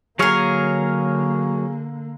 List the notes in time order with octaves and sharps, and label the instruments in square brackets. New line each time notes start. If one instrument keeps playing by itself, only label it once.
[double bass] D3 A#3 [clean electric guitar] F#3 C#5 F5 [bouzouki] G#4 A#4